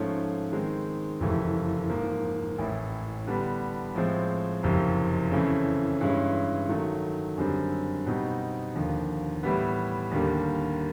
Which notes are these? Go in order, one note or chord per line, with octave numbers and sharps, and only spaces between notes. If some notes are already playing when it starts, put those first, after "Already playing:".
Already playing: G#2 F3 A3 C#4
D#3 G#3 C4
F#1 F2 C3 E3 A3
G#2 F3 A#3
A1 A2 E3
D3 G3 B3 D4
A2 F3 G#3 C4
F#1 F2 C3
C#3 E3 A3 C4
G2 E3 G#3 C#4
D#3 F#3 A3
F#2 D3 G3 C4
B2 G3 C4 D#4 F#4
D#2 D3 F3
A2 E3 G3 B3
D#2 D3 G3 A#3